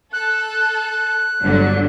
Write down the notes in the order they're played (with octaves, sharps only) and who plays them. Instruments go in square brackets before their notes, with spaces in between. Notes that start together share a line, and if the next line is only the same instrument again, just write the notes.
[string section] A4 [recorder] F#6
[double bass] G1 [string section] D3 F#3